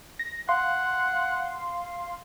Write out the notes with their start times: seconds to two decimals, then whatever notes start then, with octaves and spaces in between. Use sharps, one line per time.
0.19 A#6
0.49 F5 F#5 C6